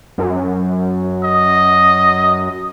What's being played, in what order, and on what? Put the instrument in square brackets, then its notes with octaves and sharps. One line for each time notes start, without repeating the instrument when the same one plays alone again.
[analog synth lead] F#2
[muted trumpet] D#5